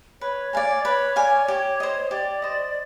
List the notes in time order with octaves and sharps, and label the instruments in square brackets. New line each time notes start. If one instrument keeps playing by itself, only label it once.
[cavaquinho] B4 [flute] C#5
[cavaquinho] D5 F5 G#5
[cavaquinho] B4 [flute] C#5
[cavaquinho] D5 F5 G#5
G4
C5 D#5
[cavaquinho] G4 [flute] D5
[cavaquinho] C5 D#5